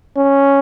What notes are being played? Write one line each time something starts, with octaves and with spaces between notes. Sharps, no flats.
C#4